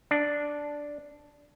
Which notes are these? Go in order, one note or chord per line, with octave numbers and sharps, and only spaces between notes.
D4